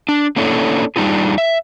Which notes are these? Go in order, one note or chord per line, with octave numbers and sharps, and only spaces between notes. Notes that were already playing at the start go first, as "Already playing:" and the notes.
D4
A3 A#3 C#4 D4 E4 A4
G3 D4 D#4 F4 G#4
E5